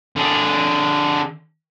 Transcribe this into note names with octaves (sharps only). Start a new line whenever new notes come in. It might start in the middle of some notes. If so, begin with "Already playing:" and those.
D3 G#4